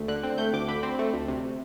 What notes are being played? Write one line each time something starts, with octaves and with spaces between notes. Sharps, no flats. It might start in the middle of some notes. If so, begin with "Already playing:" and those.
Already playing: D2 A3
D3 F#6
C4
A3 G6
D2 D6
D3 B5
C4
A3
D2
C3